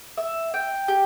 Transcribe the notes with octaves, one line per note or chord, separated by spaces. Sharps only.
E5
G5
G4